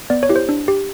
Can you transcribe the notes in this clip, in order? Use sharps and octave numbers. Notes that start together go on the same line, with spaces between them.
B3 D5
C#5
E4 G4
C5
D4
G4